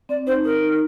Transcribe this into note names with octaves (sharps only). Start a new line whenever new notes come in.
C4 D5
D#4 C5
D#4 A#4
D#4